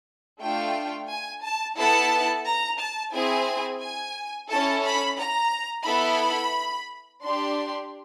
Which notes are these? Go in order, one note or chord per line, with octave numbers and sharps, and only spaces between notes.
A3 D4 F4 G5
G#5
A5
B3 E4 A4 A5
A#5
A5
C4 E4 G#4 G#5
G#5
C#4 E4 A4 A5
B5
A#5
B3 E4 A4 B5
D4 G4 C6